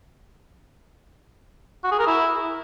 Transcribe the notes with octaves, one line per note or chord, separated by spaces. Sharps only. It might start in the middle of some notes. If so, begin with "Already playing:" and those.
F#4
G#4
A#4
E4